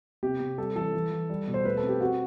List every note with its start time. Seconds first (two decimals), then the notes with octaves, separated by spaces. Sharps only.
0.23 C3 G4
0.40 C3
0.58 G3 A4
0.76 E3 A4
0.94 E3
1.11 E3
1.30 G3
1.48 B2
1.54 C5
1.65 A3 B4
1.77 A4
1.83 C4
1.89 G4
2.01 C4 F#4